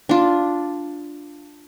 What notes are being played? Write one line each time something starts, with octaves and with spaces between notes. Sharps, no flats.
D4 F4